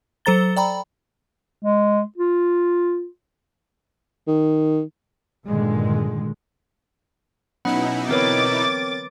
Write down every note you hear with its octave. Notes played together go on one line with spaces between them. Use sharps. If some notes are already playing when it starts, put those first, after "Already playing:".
F#3 A4 C5 A#5 A6 G7
D5 G5 A#5 B5
G#3
F4
D#3
G2 A#2 D3 D#3 G#3
B2 F#3 B3 C#4 D#4 E4 F#5 B5
D3 E3 C4 A#4 B4 C#5 D6 A6